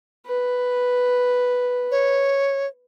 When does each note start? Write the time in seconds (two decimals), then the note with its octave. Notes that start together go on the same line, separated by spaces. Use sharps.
0.27 B4
1.91 C#5